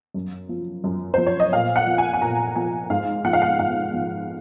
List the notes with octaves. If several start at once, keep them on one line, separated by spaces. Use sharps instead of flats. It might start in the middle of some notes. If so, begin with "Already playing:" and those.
F#2
F3
F#2
F3 C5
C#5
D#5
A#2 F5
F#5
F3
G#5
G#5
A#2 A#5
F3 G#5
G#2 F5
F3 F#5
F5
F#5
G#2 F5
F3